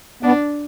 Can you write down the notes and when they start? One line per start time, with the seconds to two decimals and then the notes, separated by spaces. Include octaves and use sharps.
0.23 B3 D4